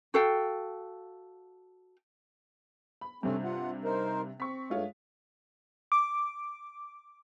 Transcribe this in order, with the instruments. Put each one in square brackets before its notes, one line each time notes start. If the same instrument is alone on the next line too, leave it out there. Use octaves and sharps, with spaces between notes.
[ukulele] F#4 A4 F5 G5
[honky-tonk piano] B5
[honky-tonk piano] G2 C3 [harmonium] A3 C4 C#4
[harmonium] F4 F#5
D#4 A#4 C5
[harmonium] C4 [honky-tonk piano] C#6 B6
[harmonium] G2 A3 [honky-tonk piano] G#3 F4 C#5
[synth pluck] D6